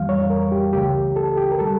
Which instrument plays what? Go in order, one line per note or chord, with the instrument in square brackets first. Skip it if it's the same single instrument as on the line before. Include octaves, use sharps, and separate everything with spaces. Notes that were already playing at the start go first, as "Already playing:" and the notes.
Already playing: [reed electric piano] F2 E3 G3 F5
C#5
A#4
G4
C#2 C#3 E3 A3 G4
A4
G4
A#4
D3 G3 A4